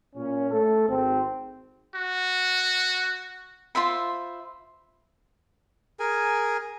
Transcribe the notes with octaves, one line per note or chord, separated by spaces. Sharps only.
A#2 C#4
A3 A4
G#1 C4
F#4
F4 C5 E5 B5
G#4 A#4 G#5